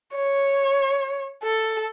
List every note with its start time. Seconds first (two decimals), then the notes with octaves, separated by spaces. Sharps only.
0.15 C#5
1.43 A4